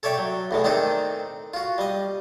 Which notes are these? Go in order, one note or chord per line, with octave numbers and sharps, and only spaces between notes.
A4 C#5 D5 E5 G5
F#3
E2 A2 G#3
D#3 C4 D4 D#4 A4
F4 F#4
G3 D#5